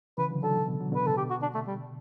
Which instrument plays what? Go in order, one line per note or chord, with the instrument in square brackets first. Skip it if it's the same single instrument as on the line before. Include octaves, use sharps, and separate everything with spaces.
[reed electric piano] C#3 E3 [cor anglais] B4
[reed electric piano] D3 F#3
[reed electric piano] D3 F#3 [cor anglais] A4
[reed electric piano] B2 D3
B2
D3 F#3
[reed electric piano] B2 D3 [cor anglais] B4
[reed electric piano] A2 C#3 [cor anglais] A4
[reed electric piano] B2 D3 [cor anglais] G4
[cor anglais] F#4
D4
A3
G3